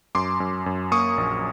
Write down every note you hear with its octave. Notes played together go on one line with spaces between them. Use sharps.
F#2 C6 D6
F#2
F#2
A#3 C#6 D#6
A#1